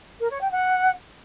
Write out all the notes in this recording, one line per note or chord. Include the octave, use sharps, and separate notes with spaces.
A#4
C#5
G5
F#5